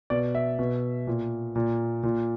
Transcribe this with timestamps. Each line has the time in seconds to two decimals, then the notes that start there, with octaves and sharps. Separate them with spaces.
0.10 B2 D5
0.35 E5
0.59 B2
1.07 A#2
1.56 A#2
2.03 A#2